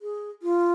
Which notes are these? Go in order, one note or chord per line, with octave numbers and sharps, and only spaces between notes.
G#4
F4